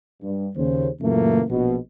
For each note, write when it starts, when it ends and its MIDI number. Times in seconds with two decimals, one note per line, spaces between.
0.22 0.47 43
0.56 0.88 39
0.56 0.88 49
0.56 0.88 72
1.01 1.41 42
1.01 1.41 46
1.01 1.41 49
1.01 1.41 52
1.01 1.41 57
1.01 1.41 58
1.49 1.76 34
1.49 1.76 47